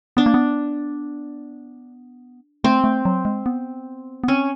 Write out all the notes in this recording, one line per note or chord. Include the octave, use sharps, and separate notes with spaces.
B3 D4
A#3
B3
A3 C4
A3
F#3
G#3
B3
B3
C4 C#4